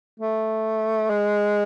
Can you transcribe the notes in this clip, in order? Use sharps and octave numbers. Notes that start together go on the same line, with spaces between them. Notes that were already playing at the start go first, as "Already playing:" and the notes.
A3
G#3